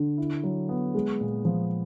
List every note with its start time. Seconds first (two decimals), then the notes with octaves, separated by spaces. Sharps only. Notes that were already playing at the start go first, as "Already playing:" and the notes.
Already playing: D3
0.18 E4
0.43 F#3
0.69 B3
0.95 G#3
1.21 A#2
1.45 F3